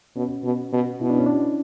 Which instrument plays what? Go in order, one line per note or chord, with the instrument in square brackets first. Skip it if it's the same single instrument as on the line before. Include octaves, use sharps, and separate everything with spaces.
[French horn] B2 [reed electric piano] C#4
[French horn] B2
B2
[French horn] B2 [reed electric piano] E4
[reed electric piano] D4
C#4
D4